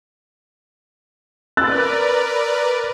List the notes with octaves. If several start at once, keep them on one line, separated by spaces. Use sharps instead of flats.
A#4 B4 D5 E6 F#6 A6